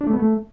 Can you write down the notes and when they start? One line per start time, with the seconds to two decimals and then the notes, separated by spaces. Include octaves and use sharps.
0.01 D4
0.07 A3
0.13 B3
0.19 A3